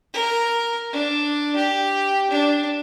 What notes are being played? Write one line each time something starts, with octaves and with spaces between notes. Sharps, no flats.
A#4
D4
G4
D4